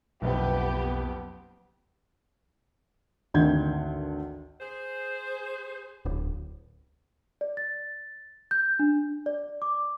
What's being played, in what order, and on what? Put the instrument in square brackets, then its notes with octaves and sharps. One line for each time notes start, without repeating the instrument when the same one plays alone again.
[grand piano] F#1 F2 [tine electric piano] B1 [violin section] B3 G4
[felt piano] G#1 D2 D#3 D4 G6 G#6
[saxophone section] G#4 C5
[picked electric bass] D1
[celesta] D5
A6
G6
D4
D5
D6